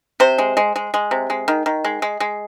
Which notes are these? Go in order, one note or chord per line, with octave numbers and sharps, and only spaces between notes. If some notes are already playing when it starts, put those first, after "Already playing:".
C3 C5
G#3
G#3
G#3
G#3
C3
G#3
D#3
D#3
G#3
G#3
G#3